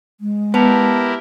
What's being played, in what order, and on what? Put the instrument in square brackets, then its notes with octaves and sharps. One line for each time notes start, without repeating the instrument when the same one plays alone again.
[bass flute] G#3
[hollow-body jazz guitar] B3 [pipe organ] E4 G4 A#4 [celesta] B4 A5 F7